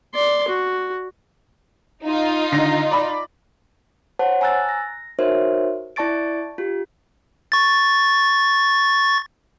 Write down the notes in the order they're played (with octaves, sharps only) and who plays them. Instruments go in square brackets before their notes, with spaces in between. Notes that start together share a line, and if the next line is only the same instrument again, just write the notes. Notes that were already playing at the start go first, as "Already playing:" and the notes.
[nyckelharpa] D5 C6
F#4
[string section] D#4 F4
[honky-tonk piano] D3 D#3 A#6
D5 B5
[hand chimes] C5 C#5 F#5 A5
G#5 A#5 E6 F#6 A6
A#6
D#4 F#4 A#4 C5 C#5 E5
E4 D5 A5 C#6 A6 D7
F4 G4
[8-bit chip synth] C#6 A6